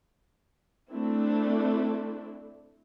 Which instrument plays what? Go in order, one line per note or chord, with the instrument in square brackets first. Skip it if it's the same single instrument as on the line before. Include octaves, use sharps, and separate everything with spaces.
[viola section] A3 C4 D4 E4